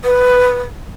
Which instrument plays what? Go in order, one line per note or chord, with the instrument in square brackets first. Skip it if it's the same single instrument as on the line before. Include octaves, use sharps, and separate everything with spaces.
[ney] B4